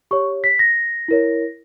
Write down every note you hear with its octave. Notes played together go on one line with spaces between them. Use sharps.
G4 C#5 C#6
B6
A#6
E4 A#4 C#5